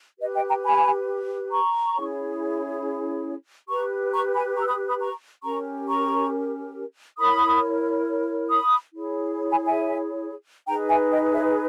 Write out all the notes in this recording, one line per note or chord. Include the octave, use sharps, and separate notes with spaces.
G4 B4 D#5
D#5 G5
G5 A#5
G#5 B5
A#5 C#6
C#4 E4 G#4 C#5
G4 B4 A#5 C#6
A#5 C#6
G#5 B5
A#5 C#6
E6
B5 D#6
B5 D#6
A#5 C#6
C#4 G4 A#4 A#5 C#6
A#5 C#6
E4 A#4 C#5 B5 D#6
B5 D#6
E4 G#4 C#5
G#5 B5
E5 G#5
D#4 G#4 B4 G5 A#5
E5 G#5
D#5 G5
C#5 E5